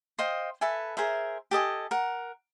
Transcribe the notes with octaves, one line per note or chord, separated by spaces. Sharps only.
C5 D#5 F5 G5
A4 B4 E5 G#5
G#4 A#4 C5 E5
G4 A4 D#5 G#5
A#4 F#5